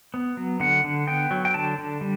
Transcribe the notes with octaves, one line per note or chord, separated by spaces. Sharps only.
B3
F#3
D3 F#5
D3
B3 G5
F#3
G5
D3 A5
D3
G3